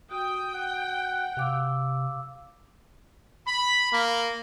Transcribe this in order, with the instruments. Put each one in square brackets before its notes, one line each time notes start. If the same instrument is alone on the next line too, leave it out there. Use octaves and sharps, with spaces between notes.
[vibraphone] F#4 [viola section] G5 [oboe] D#6
[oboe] F#5
[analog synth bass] C3 [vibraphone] F5 D6 E6
[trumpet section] B5
A#3